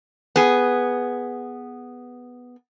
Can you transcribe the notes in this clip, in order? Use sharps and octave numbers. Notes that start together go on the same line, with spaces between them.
B3 G#4